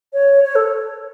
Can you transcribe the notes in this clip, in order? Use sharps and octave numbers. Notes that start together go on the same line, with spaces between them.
C#5
C#5
A4